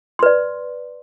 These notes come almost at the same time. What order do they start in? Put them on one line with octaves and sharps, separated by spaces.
C6 B4 D5